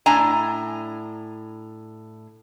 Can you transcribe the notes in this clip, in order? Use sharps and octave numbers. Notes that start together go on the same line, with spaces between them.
A2 D4 G#5 A#5